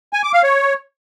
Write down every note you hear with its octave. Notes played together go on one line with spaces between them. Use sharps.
G#5
D6
F5
C#5